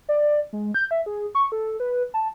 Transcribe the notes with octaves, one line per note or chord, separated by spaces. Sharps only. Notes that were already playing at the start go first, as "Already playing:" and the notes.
D5
G#3
G6
E5
G#4
C#6
A4
B4
A5